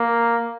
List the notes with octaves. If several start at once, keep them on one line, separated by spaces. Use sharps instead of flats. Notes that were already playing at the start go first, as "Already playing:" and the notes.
Already playing: A#3